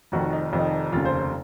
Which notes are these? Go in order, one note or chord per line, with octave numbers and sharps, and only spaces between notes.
F1 F2 D#3 F#4
D#4
F1 F2 D#3
D#4
F1 D#2 C#3 F4
C5
C5